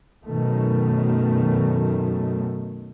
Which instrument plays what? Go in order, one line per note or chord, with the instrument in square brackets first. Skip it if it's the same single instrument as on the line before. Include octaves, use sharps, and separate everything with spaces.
[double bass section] F#2 B2 D#3 A3